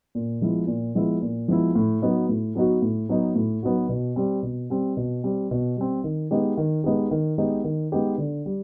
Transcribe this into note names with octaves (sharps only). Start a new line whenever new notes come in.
A#2
F3 G#3 B3 E4
A#2
F3 G#3 B3 E4
A#2
F3 G#3 B3 E4
A2
F#3 B3 D#4 F#4
A2
F#3 B3 D#4 F#4
A2
F#3 B3 D#4 F#4
A2
F#3 B3 D#4 F#4
B2
G3 C4
B2
G3 C4
B2
G3 C4
B2
G3 C4
D#3
G#3 B3 D#4 G4
D#3
G#3 B3 D#4 G4
D#3
G#3 B3 D#4 G4
D#3
G#3 B3 D#4 G4
D3
G3